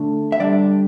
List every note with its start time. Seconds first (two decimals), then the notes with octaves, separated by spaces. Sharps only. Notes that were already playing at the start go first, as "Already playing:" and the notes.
Already playing: D3 A3 D4
0.32 E5
0.40 D3 G3 D4 D5